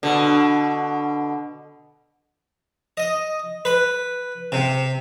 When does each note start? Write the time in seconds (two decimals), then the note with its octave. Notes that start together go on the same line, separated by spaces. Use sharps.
0.03 B2 D3
2.97 D#5
3.65 B4
4.52 C3